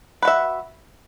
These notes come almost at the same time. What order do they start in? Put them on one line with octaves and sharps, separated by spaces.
B4 F#4 E5